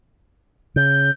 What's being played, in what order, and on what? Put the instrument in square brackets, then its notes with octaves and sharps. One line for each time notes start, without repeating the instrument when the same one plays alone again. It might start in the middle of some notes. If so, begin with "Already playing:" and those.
[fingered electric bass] C#3 [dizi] G6